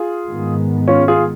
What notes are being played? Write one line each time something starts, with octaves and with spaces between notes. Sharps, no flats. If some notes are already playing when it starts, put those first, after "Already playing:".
Already playing: F4 G#4
G#2 D#3 G#3 B3
C#4 F4
F4 G#4